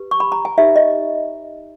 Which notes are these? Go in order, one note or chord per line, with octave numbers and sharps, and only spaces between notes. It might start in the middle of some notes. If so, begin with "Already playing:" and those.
Already playing: G4 B4
C#6
B5
A#5
G#5
D#4 G4 A#4 C#5 E5
D#5